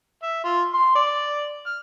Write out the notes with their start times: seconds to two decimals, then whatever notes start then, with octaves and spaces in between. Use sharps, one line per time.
0.23 E5
0.44 F4
0.74 C6
0.96 D5
1.66 F6